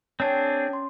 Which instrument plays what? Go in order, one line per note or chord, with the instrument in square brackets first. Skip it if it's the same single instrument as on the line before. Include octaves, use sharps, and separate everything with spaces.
[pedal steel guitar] C4 D4 G#4 [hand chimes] C#5 G5 A5
[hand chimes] C#4 C6